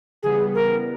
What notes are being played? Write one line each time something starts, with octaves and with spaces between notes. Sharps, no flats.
C#3 E3 G3 B3 G#4
A#4